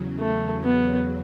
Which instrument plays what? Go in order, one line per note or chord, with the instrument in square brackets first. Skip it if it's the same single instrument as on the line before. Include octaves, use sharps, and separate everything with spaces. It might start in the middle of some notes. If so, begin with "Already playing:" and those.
Already playing: [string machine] E2 C#3 F#3
[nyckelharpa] A3
B3